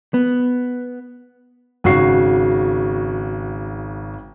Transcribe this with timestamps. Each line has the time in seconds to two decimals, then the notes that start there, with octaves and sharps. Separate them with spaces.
0.14 B3
1.84 G#1 C#3 F#4 C#6 C7